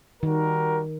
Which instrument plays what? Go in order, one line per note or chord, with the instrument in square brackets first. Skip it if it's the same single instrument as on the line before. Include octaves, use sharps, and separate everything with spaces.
[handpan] D#3 [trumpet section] G3 F#4 A#4